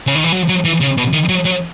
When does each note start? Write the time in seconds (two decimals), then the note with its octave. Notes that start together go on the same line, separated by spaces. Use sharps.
0.07 C#3
0.15 D#3
0.24 E3
0.32 F#3
0.49 F#3
0.65 E3
0.81 C#3
0.97 B2
1.13 D#3
1.29 F#3
1.45 F#3